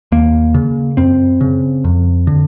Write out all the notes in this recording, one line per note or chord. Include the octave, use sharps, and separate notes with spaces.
D#2 A#3
C#3
F#2 C4
C#3
F2
D3